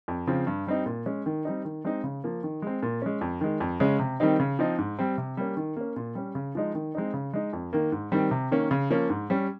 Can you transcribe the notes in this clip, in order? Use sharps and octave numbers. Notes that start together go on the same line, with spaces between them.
F2
C#3 F3 C4
G2
G3 C4 D#4
A#2
G#3 C#4
D#3
G3 C4 D#4
D#3
G#3 C4 D#4
C#3
F3 A#3
D#3
G#3 C4
A#2
G#3 C#4
F2
D#3 G#3
F2
C#3 G#3 C#4
C3
D#3 G3 C4 D#4
C#3
F3 C4 D#4
G#2
G3 C4
C3
G3 A#3 C#4
D#3
A#3 C#4
A#2
G3 C#4
C#3
F3 G#3 D#4
D#3
G#3 C4 D#4
C#3
G#3 D#4
F2
D#3 A#3
G#2
D#3 G3 C4
C3
D#3 A#3 C#4
C#3
F3 A#3 C#4
G#2
G3 C#4